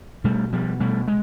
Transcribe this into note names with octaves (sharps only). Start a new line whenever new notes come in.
B2 G3 A3
B2 F3 G3
B2 G3 A3
G#3